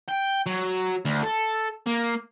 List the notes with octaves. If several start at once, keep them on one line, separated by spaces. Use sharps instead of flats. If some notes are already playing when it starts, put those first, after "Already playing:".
G5
F#3
D2
A4
A#3